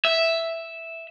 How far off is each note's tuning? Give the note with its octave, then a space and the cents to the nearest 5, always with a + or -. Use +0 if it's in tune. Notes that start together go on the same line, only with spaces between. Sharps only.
E5 +0